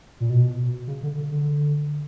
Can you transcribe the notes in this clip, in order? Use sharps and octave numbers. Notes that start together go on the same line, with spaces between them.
A#2
B2
C#3
D3
D3
D3